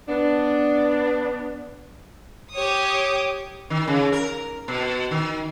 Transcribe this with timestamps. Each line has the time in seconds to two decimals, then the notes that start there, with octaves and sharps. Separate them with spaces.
0.08 B3 D4
2.54 G4 C#5 D#6
3.70 D#3
3.87 C#3
4.12 A#4
4.68 B2
5.11 D#3